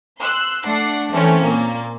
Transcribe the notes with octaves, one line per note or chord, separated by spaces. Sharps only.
C6 E6 F#6
A3 D4 F#5 C7
E3 A3 C4 C#4
A#2 A#3